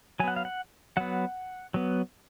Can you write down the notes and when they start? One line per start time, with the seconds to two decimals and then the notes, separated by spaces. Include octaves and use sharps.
0.20 F#3 G#5
0.24 B3 F#5
0.36 F5
0.45 F#5
0.97 F#3 B3 F#5
1.74 F#3 B3